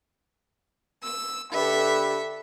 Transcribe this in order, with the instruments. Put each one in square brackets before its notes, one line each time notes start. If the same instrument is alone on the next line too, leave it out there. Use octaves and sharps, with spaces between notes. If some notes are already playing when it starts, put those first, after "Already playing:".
[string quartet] E6
[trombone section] D3 G4 B4 [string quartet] A4 E5